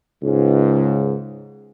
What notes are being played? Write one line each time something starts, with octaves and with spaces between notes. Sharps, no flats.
C#2 G#2